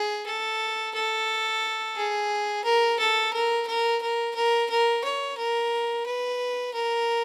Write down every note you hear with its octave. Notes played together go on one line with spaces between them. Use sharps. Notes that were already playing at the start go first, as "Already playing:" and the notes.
Already playing: G#4
A4
A4
G#4
A#4
A4
A#4
A#4
A#4
A#4
A#4
C#5
A#4
B4
A#4